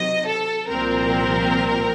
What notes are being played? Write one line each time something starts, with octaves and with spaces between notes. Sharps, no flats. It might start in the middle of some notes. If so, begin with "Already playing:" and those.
Already playing: C3 D#3 F#3 D#5
A4
C2 A#2 F3 C4 A#4